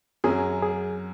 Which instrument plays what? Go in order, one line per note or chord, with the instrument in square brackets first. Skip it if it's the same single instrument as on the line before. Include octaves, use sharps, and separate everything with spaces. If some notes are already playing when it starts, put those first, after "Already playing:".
[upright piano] F#2 F#3 C#4 F#4 [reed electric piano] G#4
[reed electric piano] G#4